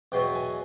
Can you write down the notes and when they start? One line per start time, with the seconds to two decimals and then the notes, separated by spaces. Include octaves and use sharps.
0.12 E2 B2 F#3 G5
0.35 G#5